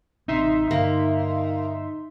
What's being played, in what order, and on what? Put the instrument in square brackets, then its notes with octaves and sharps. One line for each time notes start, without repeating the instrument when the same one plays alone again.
[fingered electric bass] A1 C3 C4 [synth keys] D#4 E5 C6
[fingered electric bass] G2 D3 [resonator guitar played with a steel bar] A#3